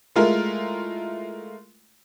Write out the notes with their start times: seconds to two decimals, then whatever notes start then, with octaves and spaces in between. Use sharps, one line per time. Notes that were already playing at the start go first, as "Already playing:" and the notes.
0.16 G#3 A3 E4 F4 A#4